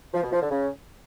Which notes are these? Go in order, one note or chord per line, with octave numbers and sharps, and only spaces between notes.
F3
B2
F3
D3
C#3